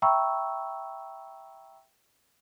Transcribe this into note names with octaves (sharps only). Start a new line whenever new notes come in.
E5 G5 A#5 B5 C#6 E6